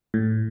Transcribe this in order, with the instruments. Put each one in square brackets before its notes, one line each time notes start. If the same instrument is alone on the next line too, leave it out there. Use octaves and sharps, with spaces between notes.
[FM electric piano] A2